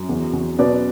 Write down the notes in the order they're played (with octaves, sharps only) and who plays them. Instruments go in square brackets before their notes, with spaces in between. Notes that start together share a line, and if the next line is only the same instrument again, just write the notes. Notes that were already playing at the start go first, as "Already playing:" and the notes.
Already playing: [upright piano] F#2
E2
E2
B2 B4 D5